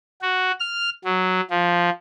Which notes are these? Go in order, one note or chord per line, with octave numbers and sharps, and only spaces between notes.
F#4
F6
F#3
F3